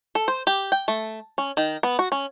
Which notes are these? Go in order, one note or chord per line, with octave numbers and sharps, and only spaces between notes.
A4
C5
G4
G5
A3
C#4
D#3
B3
F#4
C#4